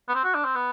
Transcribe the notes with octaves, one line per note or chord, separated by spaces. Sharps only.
B3
C4
F#4
D4
C4
B3